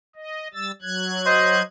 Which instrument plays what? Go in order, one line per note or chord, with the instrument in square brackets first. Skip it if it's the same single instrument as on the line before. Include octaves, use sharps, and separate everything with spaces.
[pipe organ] D#5
G3 E6 A6
F#3 F#6 G#6
[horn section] C5 D#5